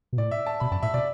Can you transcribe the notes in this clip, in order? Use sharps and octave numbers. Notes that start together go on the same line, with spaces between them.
B2
A2 D5
E5
A5
B2 B5
F#2 A5
A2 E5
B2 D5